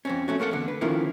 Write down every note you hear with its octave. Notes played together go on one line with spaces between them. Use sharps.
F2 C4 C#4
A3 C#4 F#4
A3 A#3 A4 F#5
E2 D3
B4
D3 D#3 F3 A#3 C#4 E4